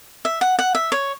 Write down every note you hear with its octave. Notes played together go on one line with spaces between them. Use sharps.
E5
F#5
F#5
E5
C#5